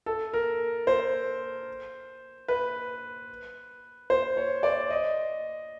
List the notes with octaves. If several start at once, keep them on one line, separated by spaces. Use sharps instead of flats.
A4
A#4
C5
B4
C5
C#5
D5
D#5